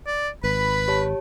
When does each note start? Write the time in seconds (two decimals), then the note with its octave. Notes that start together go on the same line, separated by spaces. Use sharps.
0.06 D5
0.44 G#1 B4 B5
0.88 G4 C#5 A5